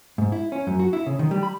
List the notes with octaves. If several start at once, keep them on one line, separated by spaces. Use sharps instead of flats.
G#2
E4
C#4
F#2
F#4
E4
C#3
D#3
G3
B5